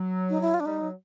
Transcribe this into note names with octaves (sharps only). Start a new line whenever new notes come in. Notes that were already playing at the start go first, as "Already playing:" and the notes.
Already playing: F#3
D#4
E4
F4
D4
G3 D#4
F#3